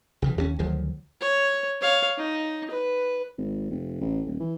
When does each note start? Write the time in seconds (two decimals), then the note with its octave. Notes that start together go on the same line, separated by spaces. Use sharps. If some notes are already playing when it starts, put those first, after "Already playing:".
0.22 C2 C#3 E3
0.38 D#2 A#3 C#4
0.59 D2 D#3 F3 F#3
1.21 C#5
1.81 C#5 F5
2.18 D#4
2.70 B4
3.38 G#1
3.70 F1
4.01 A1
4.26 D#1
4.40 E3